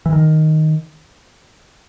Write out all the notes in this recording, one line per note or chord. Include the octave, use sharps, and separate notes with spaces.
E3
D#3